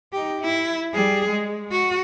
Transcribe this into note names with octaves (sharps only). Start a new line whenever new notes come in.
D#4 G4
E4
G3 G#4
G#3
F#4